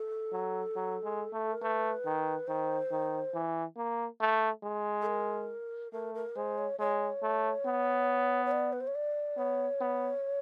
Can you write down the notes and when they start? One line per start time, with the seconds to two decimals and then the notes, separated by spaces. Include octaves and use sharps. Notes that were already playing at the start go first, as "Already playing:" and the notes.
Already playing: A4
0.32 F#3
0.76 F#3
1.04 G#3
1.33 A3
1.52 A#4
1.62 A3 B4
2.05 D#3
2.47 D#3 C5
2.91 D#3
3.34 E3
3.77 A#3
4.20 A3
4.63 G#3
5.02 A4
5.06 A#4
5.92 A3 A#4
6.15 A#4
6.36 G#3 C5
6.58 C#5
6.79 G#3 C#5
7.23 A3
7.66 B3
8.45 C#5
8.52 D5
8.73 B4
8.81 C5
8.87 C#5
8.95 D5
9.38 B3 C#5
9.81 B3